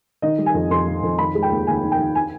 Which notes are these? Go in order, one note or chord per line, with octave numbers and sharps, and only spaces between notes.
D#3 D#5
G3
G#5
F2
F2 C6
D#3
F2
D#3 B5
G#3
G5
D#2
D#2 G#5
D#3
G5
D#3
G#5